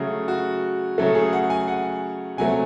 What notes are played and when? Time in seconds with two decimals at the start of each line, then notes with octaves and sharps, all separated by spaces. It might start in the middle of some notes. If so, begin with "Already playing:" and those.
Already playing: C#3 F#3 A3
0.28 F#4
0.98 C#3 F#3 A3 A4
1.15 G#4
1.33 F#5
1.50 G#5
1.68 F#5
2.37 C3 F#3 A3 G#5